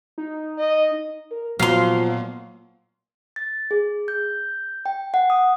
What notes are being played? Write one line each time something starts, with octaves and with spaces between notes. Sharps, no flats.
D#4
D#5
A#4
A#2 F3 F#3 A#3 B3 F5 C6
A6
G#4
G6
G5
F#5
D#6